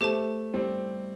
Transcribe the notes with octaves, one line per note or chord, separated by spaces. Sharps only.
A3 G4 C5 A5
G3 C4